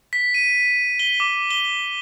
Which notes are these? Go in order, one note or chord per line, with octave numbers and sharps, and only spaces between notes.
B6
D#7
G7
D6
G7